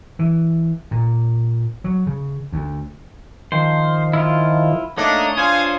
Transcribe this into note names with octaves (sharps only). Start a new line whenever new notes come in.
E3
A#2
F#3
C#3
D2
D#3 F3 C5
E4 F4
A3 A#3 D4 D#4 C#5 D#6
D4 F4 C5 F5 G#5